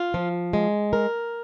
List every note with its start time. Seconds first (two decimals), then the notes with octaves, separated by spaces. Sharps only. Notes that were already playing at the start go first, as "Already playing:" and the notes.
Already playing: F4
0.14 F3
0.53 G#3
0.93 A#4